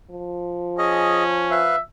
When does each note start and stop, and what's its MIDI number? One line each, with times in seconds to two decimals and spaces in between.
0.10 1.82 53
0.78 1.61 61
0.78 1.23 68
0.78 1.23 75
1.51 1.76 71
1.51 1.78 76
1.51 1.76 77